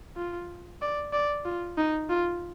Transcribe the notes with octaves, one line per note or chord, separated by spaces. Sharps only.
F4
D5
D5
F4
D#4
F4